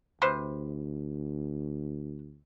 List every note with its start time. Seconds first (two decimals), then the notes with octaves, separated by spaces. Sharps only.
0.22 D2 C3 B4 C5